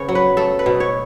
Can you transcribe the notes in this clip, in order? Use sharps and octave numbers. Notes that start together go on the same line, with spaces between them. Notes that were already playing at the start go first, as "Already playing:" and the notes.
Already playing: C#3 B3 C#5
F#3
B4
A3 A4
B4
B2
C#5